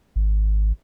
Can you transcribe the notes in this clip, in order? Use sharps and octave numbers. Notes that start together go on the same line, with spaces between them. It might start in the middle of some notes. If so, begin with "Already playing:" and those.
G#1